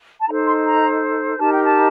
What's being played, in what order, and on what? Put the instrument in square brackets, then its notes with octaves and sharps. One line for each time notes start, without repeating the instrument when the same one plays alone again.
[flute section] A5
D#4 A4 C5 A#5
C6
A#5
D#4 G4 A#4 A5
G5
A5